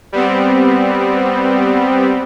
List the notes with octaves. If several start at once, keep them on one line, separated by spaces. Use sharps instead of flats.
G3 B3 C4